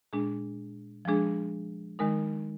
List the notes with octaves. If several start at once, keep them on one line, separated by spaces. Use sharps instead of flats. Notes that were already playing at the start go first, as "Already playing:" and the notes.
A#2 G#3 D4 G#4
F3 G#3 D4 G#4
D#3 G#3 D#4 A#4